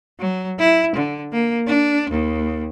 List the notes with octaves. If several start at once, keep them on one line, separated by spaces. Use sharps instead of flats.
F#3
E4
D3
A#3
D4
D#2